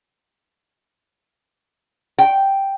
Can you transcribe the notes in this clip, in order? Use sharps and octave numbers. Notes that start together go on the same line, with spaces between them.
G5